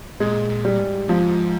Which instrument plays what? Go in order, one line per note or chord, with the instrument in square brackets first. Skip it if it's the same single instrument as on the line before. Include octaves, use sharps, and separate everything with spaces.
[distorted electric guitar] A#2 [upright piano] G#3
[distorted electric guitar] A#2
[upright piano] G3
[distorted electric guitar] G#2
[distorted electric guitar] G#2 [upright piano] F3